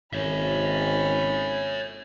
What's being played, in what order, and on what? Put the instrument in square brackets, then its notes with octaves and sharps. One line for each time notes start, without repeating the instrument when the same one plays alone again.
[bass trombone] G#1 [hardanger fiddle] C#4 B5 [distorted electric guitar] C#5 E5